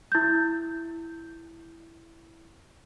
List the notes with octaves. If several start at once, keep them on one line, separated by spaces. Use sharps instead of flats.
E4 G6